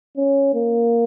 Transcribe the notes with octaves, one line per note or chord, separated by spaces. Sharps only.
C#4
A#3